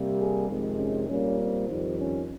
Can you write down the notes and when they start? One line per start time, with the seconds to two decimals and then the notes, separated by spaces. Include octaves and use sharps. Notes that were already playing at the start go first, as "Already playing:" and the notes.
Already playing: C3 G3 A#3
0.19 G#4
0.49 F2 C3 D#3 G#3
0.79 C#4
1.08 A#2 G3 A#3 C#4
1.39 C4
1.68 F2 D#3 G3
1.98 C#4